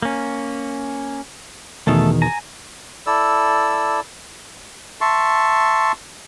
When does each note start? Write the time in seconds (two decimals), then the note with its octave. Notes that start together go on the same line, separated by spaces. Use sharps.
0.02 A#3 C#4
1.87 E2 B2 D#3 A3 A4 E5
2.22 G#5 A#5
3.07 E4 A4 D5 E6
5.01 E5 A5 C6 C#6